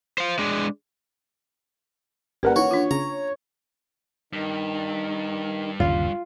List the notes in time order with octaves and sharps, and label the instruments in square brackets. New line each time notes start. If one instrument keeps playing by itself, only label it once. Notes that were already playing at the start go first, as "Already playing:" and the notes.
[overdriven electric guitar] C5 F5
G#3 D4
[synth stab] G#1 A#4 F#5 [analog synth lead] G3 [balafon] A#3 C#4 B4
[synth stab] D#3 E3 [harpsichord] F#4 [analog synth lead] C#5
[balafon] D4 F4
[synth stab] C#3 [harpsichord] A#5
[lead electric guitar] G2 [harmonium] D#3
[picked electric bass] G1 D#2 C#3 [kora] F4